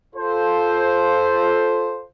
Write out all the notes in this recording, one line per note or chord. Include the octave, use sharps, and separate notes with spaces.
F4 A4 C5